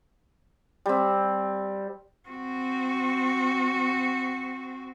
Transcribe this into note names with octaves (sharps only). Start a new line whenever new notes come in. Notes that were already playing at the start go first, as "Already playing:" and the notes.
G3 C4
C4 F#4